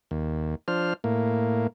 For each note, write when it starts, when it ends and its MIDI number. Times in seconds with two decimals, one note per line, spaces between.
0.11 0.55 39
0.68 0.93 53
0.68 0.93 62
0.68 0.93 72
0.68 0.93 89
1.04 1.67 45
1.04 1.67 58